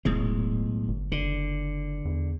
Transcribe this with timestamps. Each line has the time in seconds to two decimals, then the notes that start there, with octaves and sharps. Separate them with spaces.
0.05 D#1 B1 A2 G#3
0.88 G1
1.12 F#1 D3
2.05 E2